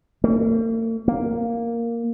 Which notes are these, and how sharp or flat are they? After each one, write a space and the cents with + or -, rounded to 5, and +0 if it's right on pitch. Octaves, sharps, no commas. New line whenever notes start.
A#3 -45
A#3 +0